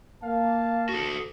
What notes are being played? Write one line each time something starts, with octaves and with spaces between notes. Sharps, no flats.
A#3 F5 A5
F#4 A4